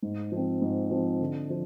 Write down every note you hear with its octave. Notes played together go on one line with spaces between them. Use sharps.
G#2
F3 C4
G#2
F3 C4
D3
F3